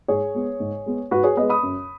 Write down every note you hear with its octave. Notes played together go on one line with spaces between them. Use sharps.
G#2 G#4 C#5
G#3 B3
G#2
G#3 B3
G#2 F#4 B4
G#4 C#5
G#3 B3 B4 D#5
B5 D#6
F#2